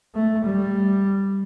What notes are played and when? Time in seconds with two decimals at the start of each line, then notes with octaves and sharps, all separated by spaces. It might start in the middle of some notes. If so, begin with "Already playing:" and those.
0.15 A3
0.45 G3